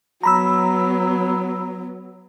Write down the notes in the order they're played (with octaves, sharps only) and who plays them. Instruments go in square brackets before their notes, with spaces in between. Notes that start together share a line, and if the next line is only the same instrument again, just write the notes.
[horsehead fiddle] F#3 B3 [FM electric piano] A#5 B5 E6